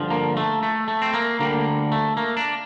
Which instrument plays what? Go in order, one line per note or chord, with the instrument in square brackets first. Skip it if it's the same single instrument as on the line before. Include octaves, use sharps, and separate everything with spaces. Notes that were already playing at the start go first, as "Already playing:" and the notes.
Already playing: [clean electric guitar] G2 D3 F3
A#3
A3
A3
A3
C4
A#3
D2 D3 G3 A#3
A3
A#3
D4